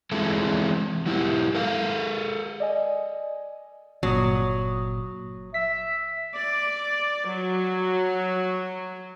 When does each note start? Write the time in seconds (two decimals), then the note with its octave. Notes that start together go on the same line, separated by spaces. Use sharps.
0.12 E3 G#3 C4 E4 A4
1.06 F#3 E4 G4
1.55 A4 A#4 F5
2.60 D5 D#5 G#5
4.03 G1 A#2 F#3 D#6
5.54 E5 B6
6.34 D5
7.28 F#3